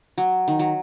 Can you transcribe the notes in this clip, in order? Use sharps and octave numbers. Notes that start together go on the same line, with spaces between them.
F#3
D#3
F#3